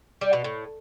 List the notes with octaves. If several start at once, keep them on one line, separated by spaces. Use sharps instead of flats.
G3
B2
A2